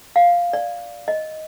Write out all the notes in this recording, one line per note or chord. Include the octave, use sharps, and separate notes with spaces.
F5
D5
D#5